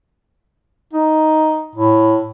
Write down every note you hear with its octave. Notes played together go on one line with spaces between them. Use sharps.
D#4
A2